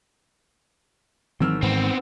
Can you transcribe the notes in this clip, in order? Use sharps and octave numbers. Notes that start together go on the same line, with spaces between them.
G#1 E3 F#3 C4 E6 F6
G#2 E3 B3 C4